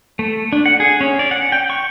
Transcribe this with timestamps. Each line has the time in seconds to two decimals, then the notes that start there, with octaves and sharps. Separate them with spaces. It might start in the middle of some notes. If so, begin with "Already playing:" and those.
0.19 A3
0.53 D4
0.66 F#5
0.80 G#4
1.01 C#4
1.19 D5
1.31 F#5
1.52 G5
1.70 C#6